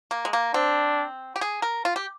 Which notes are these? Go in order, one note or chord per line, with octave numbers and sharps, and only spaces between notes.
A#3
G#3
A#3
C4 D4
G4
G#4
A#4
F4
G4